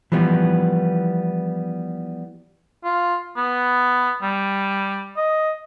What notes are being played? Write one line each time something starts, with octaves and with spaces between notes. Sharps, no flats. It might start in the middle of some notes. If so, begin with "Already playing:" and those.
E3 F3 G3 B3
F4
B3
G3
D#5